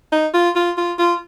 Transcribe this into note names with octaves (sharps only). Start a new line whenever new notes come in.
D#4
F4
F4
F4
F4